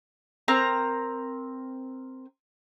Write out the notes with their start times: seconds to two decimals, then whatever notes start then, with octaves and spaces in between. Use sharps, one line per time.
0.48 C4 A#4 A#5